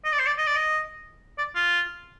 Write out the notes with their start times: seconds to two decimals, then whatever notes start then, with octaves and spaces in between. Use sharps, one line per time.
0.05 D#5
0.12 D5
0.19 C5
0.26 D5
0.38 D#5
0.47 D5
0.56 D#5
1.38 D5
1.55 F4